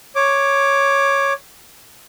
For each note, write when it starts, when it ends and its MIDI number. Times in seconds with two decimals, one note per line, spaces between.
0.15 1.33 73
0.15 1.33 86